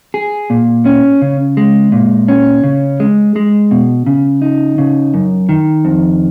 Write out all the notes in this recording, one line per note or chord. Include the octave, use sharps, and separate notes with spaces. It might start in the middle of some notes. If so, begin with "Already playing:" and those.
G#4
A#2
C#4
C#3
G#3
A#2
C#4
C#3
G#3
G#3
B2
C#3
D#4
C#3
F#2
D#3
F2